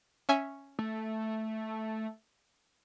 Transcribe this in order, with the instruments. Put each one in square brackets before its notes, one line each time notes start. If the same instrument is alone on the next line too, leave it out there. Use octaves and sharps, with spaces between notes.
[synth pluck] C#4 E5 G#5
[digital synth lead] A3